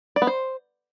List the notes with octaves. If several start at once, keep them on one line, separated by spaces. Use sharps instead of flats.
D5
B3
C5